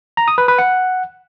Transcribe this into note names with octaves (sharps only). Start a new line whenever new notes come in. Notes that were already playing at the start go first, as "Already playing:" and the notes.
A#5
D#6
B4
B4
F#5